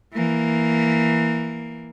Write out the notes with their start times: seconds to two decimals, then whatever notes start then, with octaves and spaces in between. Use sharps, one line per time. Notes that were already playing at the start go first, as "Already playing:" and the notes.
0.14 E3 A#3